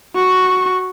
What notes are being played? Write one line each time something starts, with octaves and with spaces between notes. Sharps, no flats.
F#4 C#6